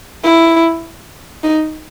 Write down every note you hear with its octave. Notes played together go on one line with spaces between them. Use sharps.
E4
D#4